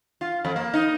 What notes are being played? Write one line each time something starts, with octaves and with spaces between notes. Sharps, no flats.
F4
F2
A#3
D#4